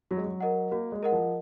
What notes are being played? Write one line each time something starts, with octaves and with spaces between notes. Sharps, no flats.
F#3 F#4
G#3
F#3
A#4 D#5 F#5
A#3 F#4
G#3
A#4 D#5 F#5
F3